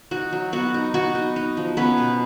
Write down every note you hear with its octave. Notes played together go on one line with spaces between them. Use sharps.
D#4 F#4
F#3
B3 F#4
D#4
B3 F#4
D#4
D#4
F3
B3 C#4 B4
B2